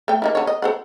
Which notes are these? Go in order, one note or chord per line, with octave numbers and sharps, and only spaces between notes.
A3 G5
A#3 D#4 E4
D3 C#5
D#5
A4 C5 F#5